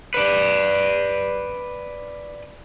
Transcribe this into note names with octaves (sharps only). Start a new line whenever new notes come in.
B4 D5